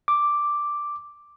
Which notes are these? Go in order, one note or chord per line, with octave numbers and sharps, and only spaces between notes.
D6